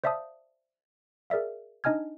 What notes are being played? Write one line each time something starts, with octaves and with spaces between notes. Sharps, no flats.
C5 D5 E5 F5 A5 D#6
G#4 A#4 D5 E5 F5
D4 D#4 D#5 G#5 F6 G#6